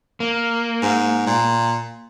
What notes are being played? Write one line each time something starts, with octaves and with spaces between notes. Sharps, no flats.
A#3
G#2
A#2